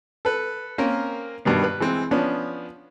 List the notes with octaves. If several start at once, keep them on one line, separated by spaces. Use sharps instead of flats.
A4 B4
A#3 C4 C#4 A#4
G2 B2 D#3 B3
B4
E3 G#3 C4
F3 B3 C#4 D4